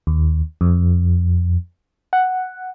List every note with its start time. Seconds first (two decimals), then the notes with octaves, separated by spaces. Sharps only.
0.07 D#2
0.61 F2
2.13 F#5